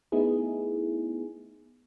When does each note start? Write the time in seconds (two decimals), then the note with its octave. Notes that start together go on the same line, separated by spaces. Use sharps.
0.12 A3 B3 D#4 E4 G#4